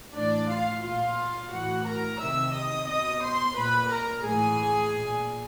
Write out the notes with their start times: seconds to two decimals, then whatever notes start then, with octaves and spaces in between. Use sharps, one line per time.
0.14 A2 E3 D4 D5
0.49 F4 F5
0.82 A#2 F4 F5
1.50 A2 E3 F#4 F#5
1.85 A#4 A#5
2.19 C3 D#3 E5 E6
2.53 D#5 D#6
2.88 B2 D#5 D#6
3.21 C5 C6
3.55 A#2 B4 B5
3.90 A#4 A#5
4.24 A2 E3 G#4 G#5
4.93 A#2